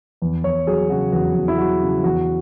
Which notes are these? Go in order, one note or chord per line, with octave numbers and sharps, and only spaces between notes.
E2
E2 C#5
F#3 G#4
C#3 F#4
E2 F#4
E2
E4
F#3 F#4
C#3
E2 F#4